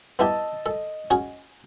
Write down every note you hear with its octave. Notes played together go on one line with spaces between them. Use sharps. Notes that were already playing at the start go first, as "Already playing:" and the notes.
B3 E4 G4 D#5 A5 E6
A4 D#5
C#4 F#4 G#4